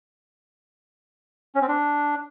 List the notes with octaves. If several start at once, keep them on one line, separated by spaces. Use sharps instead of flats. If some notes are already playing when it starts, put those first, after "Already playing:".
C#4
C4
D4